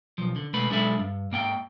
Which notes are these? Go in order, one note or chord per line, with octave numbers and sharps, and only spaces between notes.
B1 F3
D3
B2 G#3 A3 B4 B5
B1 G#3 D4 A4 E5 B5
G2
G#2 A#3 F#5 G5